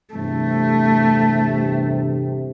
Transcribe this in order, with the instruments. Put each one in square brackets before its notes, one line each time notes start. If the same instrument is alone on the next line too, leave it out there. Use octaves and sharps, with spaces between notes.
[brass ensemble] E2 G2 C3 [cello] A3